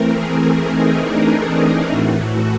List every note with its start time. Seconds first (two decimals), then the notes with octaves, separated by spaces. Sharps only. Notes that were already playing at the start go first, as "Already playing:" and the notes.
Already playing: E3 A3 C4 A#4
0.13 G#4
0.43 G#4
0.71 D#4
1.01 D4
1.90 A2 E3 A3 F#4
2.19 F#4